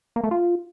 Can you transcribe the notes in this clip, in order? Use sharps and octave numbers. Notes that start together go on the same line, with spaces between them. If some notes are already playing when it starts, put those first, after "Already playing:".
A#3
A3
F4